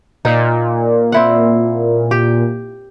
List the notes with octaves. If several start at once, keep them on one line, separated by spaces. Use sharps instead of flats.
A#2 D#4
C4 E4 F#5
G4